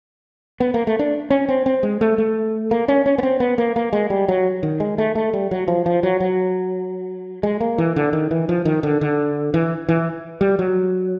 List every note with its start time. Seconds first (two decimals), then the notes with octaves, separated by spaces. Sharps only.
0.60 B3
0.74 A#3
0.87 A3
0.99 D4
1.30 C#4
1.49 C4
1.66 C4
1.83 G#3
2.01 A3
2.18 A3
2.71 A#3
2.88 C#4
3.06 C#4
3.18 B3
3.23 C4
3.40 B3
3.58 A#3
3.76 A#3
3.93 G#3
4.10 G3
4.28 F#3
4.63 D#3
4.80 G#3
4.98 A3
5.15 A3
5.33 G3
5.51 F#3
5.68 F3
5.86 F3
6.03 F#3
6.20 F#3
7.43 G#3
7.61 A#3
7.78 E3
7.96 D3
8.13 D#3
8.31 E3
8.49 F3
8.65 D#3
8.83 D3
9.01 D3
9.54 E3
9.89 E3
10.41 G3
10.59 F#3